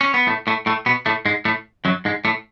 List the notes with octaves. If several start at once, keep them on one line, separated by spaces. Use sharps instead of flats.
C#4
B3
A2 A3
A2 A3
A2 A3
B2 B3
A2 A3
G#2 G#3
A2 A3
F#2 F#3
G#2 G#3
A2 A3